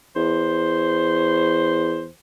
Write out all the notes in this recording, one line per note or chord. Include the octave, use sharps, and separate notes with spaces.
E2 C5